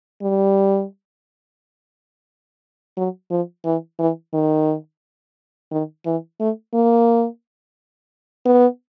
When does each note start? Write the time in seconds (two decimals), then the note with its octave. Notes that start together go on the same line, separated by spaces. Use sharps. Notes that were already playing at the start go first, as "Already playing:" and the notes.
0.22 G3
2.97 F#3
3.31 F3
3.65 E3
3.99 E3
4.34 D#3
5.71 D#3
6.06 E3
6.40 A3
6.74 A#3
8.46 B3